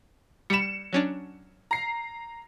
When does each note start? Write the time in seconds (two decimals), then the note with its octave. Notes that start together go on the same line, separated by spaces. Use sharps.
0.50 G3 B5 C#7 E7
0.93 F#3 C#4 D4
1.71 A#5 C7